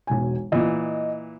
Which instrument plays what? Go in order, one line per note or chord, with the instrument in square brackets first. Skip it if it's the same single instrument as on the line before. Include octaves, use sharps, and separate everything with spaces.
[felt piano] E1 B1 G#5
[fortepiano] A#2 E3 [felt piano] D#5